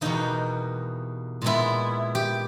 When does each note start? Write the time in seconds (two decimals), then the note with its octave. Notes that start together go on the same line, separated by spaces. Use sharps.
0.01 E2 B2 G3 A#3 D#4
1.42 A#2 G#3 B3 E4
2.15 G4